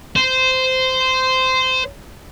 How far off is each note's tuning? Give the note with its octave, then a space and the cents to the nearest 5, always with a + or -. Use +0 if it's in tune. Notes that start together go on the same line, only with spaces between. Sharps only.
C5 -15